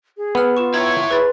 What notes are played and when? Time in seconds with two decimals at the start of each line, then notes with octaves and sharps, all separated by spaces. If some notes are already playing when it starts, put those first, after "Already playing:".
0.17 G#4
0.35 B3 E6 F6
0.57 F4 F#5 C#6 E7
0.74 E4 C#5 A#5
1.11 G#4 B4 B5 C6 A6